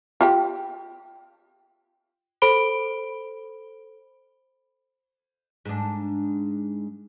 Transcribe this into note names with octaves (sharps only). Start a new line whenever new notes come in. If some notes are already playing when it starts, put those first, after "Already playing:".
F4 G4 G5
A4 C5 B5 D7 G7
G#2 D4